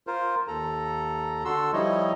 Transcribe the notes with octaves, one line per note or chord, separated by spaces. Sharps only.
F4 A#4 C5
D#2 A4 A#5
D3 F#4 A4 C6 E6
F3 G3 D#4 E4 C#5 D#5